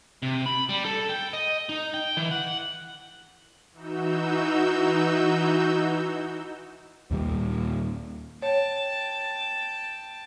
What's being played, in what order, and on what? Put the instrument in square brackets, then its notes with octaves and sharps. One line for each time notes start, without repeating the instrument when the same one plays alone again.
[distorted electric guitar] C3
B5
G3
A4
G5
D#5
D#4
G5
E3
F#5
[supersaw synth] E3 D#4 F#4 E6 G6
[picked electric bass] D#2 A#2 G3
[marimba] C#5 [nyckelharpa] G5 A5